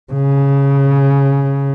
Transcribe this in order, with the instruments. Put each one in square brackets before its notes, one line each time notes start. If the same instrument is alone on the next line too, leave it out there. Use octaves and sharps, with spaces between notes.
[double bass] C#3